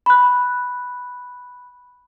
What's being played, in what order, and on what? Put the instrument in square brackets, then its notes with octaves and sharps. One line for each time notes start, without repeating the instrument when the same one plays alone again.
[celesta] B5 F#6